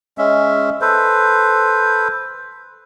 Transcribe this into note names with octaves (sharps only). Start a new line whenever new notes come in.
G#3 C#4 E5
A4 B4 C5